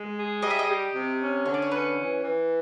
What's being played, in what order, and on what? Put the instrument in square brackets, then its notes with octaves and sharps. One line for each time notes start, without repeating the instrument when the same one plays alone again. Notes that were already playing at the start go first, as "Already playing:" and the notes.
Already playing: [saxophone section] G#3
G#4
[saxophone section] G3 [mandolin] D#5
[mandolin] E5
D#5
[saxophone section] G4
C3
C#4
[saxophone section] D3 [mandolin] C#5
[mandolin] D5
C#5
[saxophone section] C#4 [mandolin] B4
[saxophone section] E3
E3